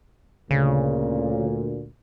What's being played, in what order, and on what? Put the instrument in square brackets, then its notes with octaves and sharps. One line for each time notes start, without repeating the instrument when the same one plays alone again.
[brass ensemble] D2 A#2 [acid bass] C#3